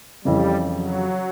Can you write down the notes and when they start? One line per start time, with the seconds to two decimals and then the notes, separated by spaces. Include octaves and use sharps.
0.24 F2 C#3 E3 G3
0.73 F#3